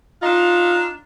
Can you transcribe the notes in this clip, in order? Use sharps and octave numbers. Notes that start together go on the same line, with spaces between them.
D4 D#4 F4